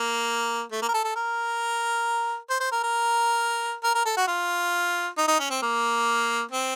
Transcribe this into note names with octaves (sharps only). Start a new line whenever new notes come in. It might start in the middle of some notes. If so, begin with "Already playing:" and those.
Already playing: A#3
A3
A#3
A#4
A4
A4
A#4
C5
C5
A#4
A#4
A#4
A#4
A4
F#4
F4
D#4
D#4
C#4
C4
A#3
C4